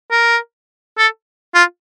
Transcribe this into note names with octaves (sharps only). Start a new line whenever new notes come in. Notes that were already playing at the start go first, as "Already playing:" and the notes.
A#4
A4
F4